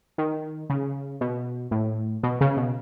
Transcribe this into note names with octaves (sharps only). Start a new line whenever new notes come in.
D#3
C#3
B2
A2
B2
C#3
B2